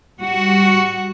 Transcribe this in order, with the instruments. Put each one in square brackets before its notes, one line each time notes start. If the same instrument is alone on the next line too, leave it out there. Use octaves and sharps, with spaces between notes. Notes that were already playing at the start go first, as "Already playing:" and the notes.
[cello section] G3 F#4